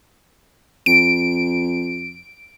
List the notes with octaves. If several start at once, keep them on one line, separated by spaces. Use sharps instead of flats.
F2 D7